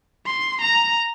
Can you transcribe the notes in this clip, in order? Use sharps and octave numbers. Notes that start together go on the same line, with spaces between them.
C6
A#5